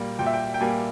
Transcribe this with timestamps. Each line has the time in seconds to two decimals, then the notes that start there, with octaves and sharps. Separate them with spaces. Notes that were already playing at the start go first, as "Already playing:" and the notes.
Already playing: A#2 G3 A#3
0.19 A#2 G5
0.26 E5
0.34 G5
0.54 G5
0.61 G3 A#3 G#5